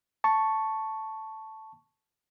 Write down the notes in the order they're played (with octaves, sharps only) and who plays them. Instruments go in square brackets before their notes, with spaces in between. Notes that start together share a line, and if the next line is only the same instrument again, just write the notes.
[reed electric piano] A5 C#6